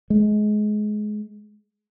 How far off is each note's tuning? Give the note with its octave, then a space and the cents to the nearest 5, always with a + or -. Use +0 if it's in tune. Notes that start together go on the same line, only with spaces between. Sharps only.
G#3 +25